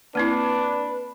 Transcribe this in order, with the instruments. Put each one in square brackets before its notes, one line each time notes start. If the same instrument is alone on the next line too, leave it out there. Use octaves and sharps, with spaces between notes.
[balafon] A#3 C4 E4 [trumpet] D4 [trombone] B4